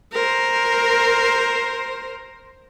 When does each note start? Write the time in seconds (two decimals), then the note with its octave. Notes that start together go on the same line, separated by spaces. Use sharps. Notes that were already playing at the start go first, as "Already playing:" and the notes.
0.12 A#4 C5